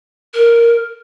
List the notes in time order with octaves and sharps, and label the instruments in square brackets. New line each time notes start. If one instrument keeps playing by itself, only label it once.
[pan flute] A#4